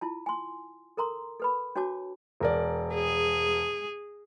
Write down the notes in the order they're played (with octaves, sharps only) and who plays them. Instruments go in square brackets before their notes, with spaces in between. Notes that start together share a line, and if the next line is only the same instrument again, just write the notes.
[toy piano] E4 F4 A5
G#5 C6
A4 A#4 A#5 C6
A4 B4 B5
D4 F#4 C#5 A5 D6
[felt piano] E1 A#4 D5
[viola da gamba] G#4